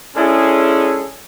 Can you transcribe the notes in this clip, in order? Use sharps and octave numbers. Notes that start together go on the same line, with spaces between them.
G#3 C#4 D4 E4 G#4 A4